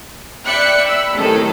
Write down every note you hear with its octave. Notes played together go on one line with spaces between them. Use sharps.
D5 E5 G5 B5 F#6 C#7
B5 E6
A2 C3 D#3 F#3 G#4 A4